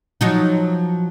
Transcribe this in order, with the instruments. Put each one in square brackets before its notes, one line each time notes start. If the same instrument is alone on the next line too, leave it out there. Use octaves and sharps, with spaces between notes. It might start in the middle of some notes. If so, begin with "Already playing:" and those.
[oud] F3 F#3 D#4